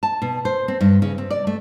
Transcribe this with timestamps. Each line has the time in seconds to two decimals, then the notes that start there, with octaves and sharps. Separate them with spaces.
0.03 A5
0.22 B2
0.45 C5
0.68 C4
0.81 G2
1.02 C#3
1.18 C4
1.30 D5
1.47 A3